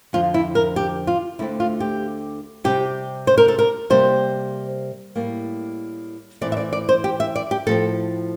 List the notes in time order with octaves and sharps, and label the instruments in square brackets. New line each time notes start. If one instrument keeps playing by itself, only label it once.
[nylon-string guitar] F2 D3 F3 C4 F4
E4
A#4
G4
F4
D2 D3 A3 C4 E4
F4
G4
C3 G3 C4 G4
C5
A#4
A4
A#4
C3 G3 A#3 C5
A2 G3 A#3
A2 E3 A3 C4 D5
E5
D5
D5
C5
G4
E5
D5
G4
A2 F3 C4 A4